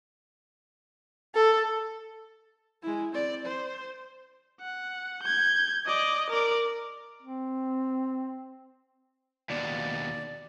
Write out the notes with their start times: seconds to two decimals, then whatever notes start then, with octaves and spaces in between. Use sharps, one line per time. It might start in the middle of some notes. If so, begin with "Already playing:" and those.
1.35 A4
2.83 G#3 E4
3.14 C4 D5
3.46 C5
4.61 F#5
5.23 G6 G#6
5.86 D5 D#5
6.30 A#4 D5
7.23 C4
9.50 D#2 B2 D5